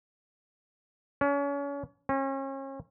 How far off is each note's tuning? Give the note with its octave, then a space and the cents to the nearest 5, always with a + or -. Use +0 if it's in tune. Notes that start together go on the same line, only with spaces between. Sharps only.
C#4 +35
C#4 -35